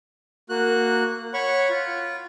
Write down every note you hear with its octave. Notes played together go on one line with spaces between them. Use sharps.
A#3 F#4 F#6
C#5 F#5 B5 C#6
F4